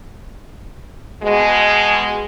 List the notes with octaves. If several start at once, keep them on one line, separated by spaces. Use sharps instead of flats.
B2 G#3